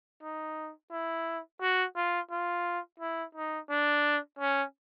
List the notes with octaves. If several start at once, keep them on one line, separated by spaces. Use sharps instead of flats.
D#4
E4
F#4
F4
F4
E4
D#4
D4
C#4